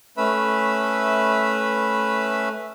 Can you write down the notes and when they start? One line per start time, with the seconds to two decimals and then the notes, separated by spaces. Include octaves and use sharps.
0.17 A3 C#4 B4 E5 B5